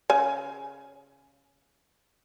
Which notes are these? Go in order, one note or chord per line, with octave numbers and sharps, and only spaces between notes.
C#3 G#5